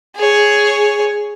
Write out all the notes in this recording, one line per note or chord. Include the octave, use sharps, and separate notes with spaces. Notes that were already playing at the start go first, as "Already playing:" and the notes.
G#4 C#5